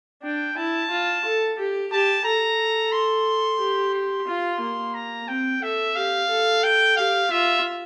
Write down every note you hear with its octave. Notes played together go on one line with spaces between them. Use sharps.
D4 G5
E4 A5
F4
A4
G4
G4 A5
A4 A#5
C6
G4
C6
F4
A#3
A#5
C4 G5
A4 E5
G4 F5
A4
G5
G4 F5
F4 E5